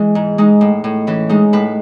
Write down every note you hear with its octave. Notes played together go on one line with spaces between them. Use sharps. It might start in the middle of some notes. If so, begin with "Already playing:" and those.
Already playing: E3 G#3
G#2
G#3 D#4
A2
A2
E3 C#4
G#3 D#4
A2 B4